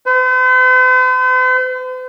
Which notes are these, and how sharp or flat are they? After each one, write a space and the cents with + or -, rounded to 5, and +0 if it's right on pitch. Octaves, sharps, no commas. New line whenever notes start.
C5 -45